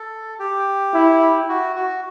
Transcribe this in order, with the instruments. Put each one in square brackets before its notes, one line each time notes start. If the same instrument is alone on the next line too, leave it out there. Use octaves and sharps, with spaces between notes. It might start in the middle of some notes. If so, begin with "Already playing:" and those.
Already playing: [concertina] A4
G4
[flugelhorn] E4
[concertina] F#4
F#4